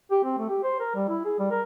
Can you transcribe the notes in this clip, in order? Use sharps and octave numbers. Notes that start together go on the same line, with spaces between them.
G4
C4
A3
G4
C5
A#4
G3
E4
G#4
G3
A#4